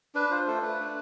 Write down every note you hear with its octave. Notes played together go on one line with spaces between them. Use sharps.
D4 B4
F4 C5
A3 A4
A3 B4
D4